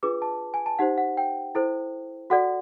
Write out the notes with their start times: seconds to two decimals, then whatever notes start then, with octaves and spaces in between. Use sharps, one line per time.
0.03 D4 F4 G#4 B4 D6
0.22 A5
0.54 G#5
0.66 A5
0.79 D#4 G4 C5 F#5
0.98 F#5
1.17 G5
1.55 E4 A4 C5
2.30 F#4 A4 D5 F#5